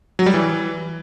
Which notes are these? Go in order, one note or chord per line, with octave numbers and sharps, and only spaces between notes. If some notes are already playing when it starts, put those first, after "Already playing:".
F#3
G3
E3